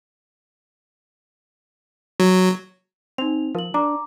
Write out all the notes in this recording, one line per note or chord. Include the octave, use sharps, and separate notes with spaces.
F#3
C4 D#4 F7
F3 A#4 F#7
D4 A#5 D6